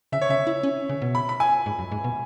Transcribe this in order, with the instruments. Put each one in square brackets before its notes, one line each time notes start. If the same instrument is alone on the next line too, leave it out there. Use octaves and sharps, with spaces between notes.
[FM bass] C#3 [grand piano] E5
[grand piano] C#5
[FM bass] C#3 [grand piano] E5
[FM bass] E4
C#4
C#3
B2
[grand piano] B5
B5
G#5
[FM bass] G#2
F#2
G#2
B2